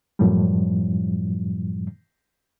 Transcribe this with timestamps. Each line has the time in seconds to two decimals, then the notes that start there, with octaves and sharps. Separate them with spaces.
0.19 F#2 A2 F3 G3